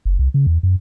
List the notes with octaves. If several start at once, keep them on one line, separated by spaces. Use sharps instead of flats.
F#1
C2
C#3
E2
F#2